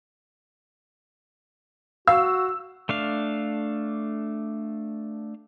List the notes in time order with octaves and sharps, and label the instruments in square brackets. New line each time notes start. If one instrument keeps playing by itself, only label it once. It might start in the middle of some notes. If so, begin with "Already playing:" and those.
[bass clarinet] F#4 [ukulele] F5 [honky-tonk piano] E6
[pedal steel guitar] A3 D4 F5